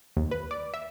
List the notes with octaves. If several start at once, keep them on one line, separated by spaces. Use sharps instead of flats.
D#2
B4
D5
E5